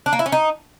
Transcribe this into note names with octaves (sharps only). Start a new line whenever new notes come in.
D4
A#3
E4
C#4
D#4